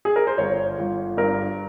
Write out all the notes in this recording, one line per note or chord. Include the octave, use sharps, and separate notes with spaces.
G#4
A#4
C5
G1 C#5
G1
G2 A#4